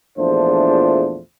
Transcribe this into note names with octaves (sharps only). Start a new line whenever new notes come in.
A#1 E2 F3 A3 D4 C5